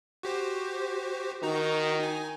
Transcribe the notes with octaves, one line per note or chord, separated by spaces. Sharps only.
F#4 G4 C5
D#3 D#4 F#4 A#5
D#4 G#5